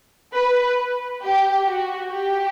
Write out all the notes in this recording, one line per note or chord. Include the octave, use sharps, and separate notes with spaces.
B4
G4
F#4
G4